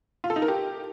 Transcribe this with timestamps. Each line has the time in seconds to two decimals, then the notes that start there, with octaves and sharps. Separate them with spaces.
0.24 F4
0.30 A4
0.36 D#4
0.42 A#4
0.48 G4